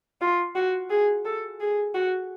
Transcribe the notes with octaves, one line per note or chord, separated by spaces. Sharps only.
F4
F#4
G#4
A4
G#4
F#4